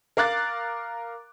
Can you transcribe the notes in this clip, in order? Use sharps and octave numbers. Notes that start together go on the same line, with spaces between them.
A#4 F5 D6 F#6 A6